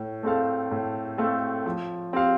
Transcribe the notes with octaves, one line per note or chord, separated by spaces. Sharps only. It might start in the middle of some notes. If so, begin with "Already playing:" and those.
Already playing: A2
A3 C4 A4 F5
A2
A3 C4 A4 F5
F3
C4 G4 F5